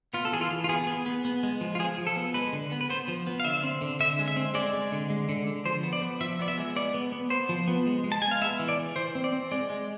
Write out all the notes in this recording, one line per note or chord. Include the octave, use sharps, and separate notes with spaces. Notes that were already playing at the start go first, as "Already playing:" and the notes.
B3 F4
A4
E3 G#4
F4
E3
F4
B3 G#4
B3
B3
B3
G#3
F3
F4
F3 G#4
F3
A4
B3
G#3 B4
D3
B3
B4
B3 C5
F3
B3
F5
D3 E5
C4
D3
D3 E5
G#3
E5
C4
G#3 D5
G#3
D3
G#3
D3
D3
F3 C5
B3
D5
B3
F3 E5
B3 D5
E5
G#3
B3 D5
B3
B3
B3 C5
F3
B3
G#3
G#3
A5
G#3 G#5
F5
B3 E5
E3
D5
E3
E3 C5
C4
D5
C4
G#3 D5
G#3